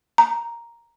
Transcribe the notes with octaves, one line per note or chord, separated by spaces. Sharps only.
A#5